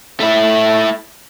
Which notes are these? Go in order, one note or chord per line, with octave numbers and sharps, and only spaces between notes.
A3 E4